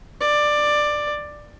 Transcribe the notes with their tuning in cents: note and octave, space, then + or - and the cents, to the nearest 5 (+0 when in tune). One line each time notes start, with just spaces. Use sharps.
D5 +15